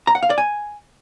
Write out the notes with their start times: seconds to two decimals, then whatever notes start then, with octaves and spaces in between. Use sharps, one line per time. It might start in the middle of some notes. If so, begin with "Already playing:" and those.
0.07 A#5
0.15 F#5
0.23 F5
0.30 D5
0.38 G#5